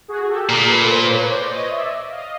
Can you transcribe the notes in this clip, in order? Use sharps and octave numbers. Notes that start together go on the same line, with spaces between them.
F#4 G#4
G#4
G4 A4
A4
A#2 G#4 A#4
A#4
A4 B4
A#4 C5
B4 C#5
C5 D5
C#5 D#5
D5 E5
D#5 F5